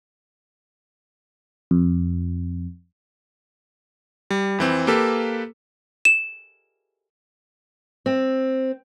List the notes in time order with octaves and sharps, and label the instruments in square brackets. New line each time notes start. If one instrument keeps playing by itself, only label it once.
[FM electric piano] F2
[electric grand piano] G3
F2 E3 C4
A#3 G4 A4 B4
[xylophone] E7
[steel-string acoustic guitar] C4